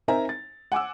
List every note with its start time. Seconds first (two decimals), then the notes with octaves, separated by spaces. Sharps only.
0.08 C4 D#4 A#4 E5 G#5 A#5
0.29 A6
0.72 F#5 G#5 D6 E6